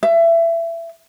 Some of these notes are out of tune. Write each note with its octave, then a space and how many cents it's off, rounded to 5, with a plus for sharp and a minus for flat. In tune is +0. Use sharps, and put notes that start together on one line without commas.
E5 +25